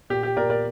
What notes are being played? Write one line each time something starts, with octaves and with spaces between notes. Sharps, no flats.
A#2 G4
G4
A#2 A#4 D5
A#4 D5